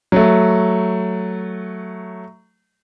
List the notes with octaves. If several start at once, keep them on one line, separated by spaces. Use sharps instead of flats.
F#3 A3